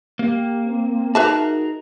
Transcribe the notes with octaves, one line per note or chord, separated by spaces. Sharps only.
A#3 G4
C4
D#4 F#4 G#4 A#4 B4 E5 A5